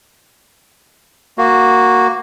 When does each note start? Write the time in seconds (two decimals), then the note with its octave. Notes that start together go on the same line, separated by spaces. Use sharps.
1.38 A#3 F#4